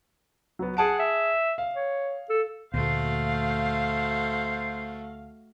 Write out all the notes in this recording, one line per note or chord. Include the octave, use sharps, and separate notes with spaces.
F#3 B3
G#4 F#5 A5 D7
E5
F5
C#5
A4
D2 A#2 A3 F#4 C5 F5